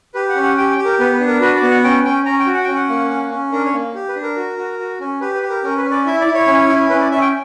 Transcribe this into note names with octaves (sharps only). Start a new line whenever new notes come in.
G4 B4
F#5
C#4
F#5
G4 G5
G5
G4
A#4
B3 B4
B4
D4
A#4
F#4 B4
D5
B3
F#5
C#4 G5
C#4 G5
C#4 A#5
G5
F#4
F#5
C#4 G5
F#5
A#3
C#4
C#4
D4 A#4
C#5
A#3
G4
B4
D4
A#4
F#4
F#4
F#4
C#4
G4 B4
B4
G4
A#4
C#4 A#4
B4
C#4
D5
E4 E5
D5
E4
C#5
C#4
E4
C#4 B4
D5
C#4 E5
G5